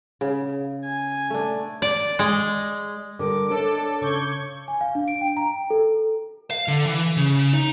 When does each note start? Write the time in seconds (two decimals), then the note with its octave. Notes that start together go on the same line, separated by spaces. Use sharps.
0.21 C#3
0.85 G#5
1.30 A3 D4
1.82 D5
2.19 G#3
3.19 D3 G3 A#4 D6
3.50 D4 A4 C#5 D#5
4.01 C#3 C#6 D6 G6 G#6
4.68 G#5
4.81 F5
4.95 D4
5.08 D7
5.21 G5
5.37 A#5
5.70 A4
6.51 F5
6.68 D3
6.86 E3
7.17 C#3
7.53 D#4